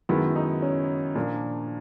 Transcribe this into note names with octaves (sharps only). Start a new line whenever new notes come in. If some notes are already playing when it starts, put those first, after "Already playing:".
F#2 D#3 G#3 B3 E4
D#4
C#4
A#2 F3 A#3 D4